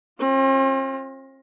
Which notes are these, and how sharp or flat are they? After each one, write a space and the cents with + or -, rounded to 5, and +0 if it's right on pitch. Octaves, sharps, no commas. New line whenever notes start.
C4 +45 F4 +15